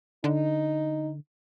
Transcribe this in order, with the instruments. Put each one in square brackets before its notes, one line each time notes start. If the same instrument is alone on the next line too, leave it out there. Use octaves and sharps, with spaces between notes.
[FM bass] D3 [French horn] D#4